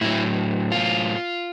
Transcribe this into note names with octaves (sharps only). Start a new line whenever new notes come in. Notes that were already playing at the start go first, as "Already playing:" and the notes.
A2 F#3 E4
F4